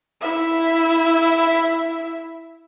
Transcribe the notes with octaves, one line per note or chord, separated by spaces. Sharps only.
E4 E5